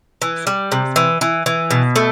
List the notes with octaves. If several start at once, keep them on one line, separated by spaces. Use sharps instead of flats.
E3
G3
C3
E3
E3
E3
B2
A3